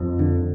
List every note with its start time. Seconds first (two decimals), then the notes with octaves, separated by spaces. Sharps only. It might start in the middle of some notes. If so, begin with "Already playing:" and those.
Already playing: F2 F3
0.19 D3